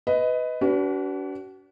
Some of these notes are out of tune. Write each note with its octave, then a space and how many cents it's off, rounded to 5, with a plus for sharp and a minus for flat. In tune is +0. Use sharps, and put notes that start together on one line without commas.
B4 +15 D#5 +15
D4 -45 F#4 +35 B4 +0